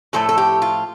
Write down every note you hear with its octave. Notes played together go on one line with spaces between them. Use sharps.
A2 F3 A3 A4
A4
G4
F4